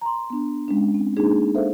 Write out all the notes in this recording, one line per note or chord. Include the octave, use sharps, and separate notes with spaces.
A#5 C6
B3 D4
G#3 C#4 D4
C4
G#3 A#3 D4 D#4 G#4
A4 C5 E5 F5